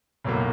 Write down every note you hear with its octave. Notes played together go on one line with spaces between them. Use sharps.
B1 A2 F#3 A#3